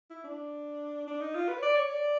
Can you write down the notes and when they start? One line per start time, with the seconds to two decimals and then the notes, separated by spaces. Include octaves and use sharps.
0.10 E4
0.24 D4
1.07 D4
1.21 D#4
1.35 F4
1.48 B4
1.58 C#5
1.62 D5
1.76 C#5
1.90 D5